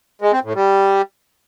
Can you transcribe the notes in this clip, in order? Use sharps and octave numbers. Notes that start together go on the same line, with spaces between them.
G#3
C4
A2
G3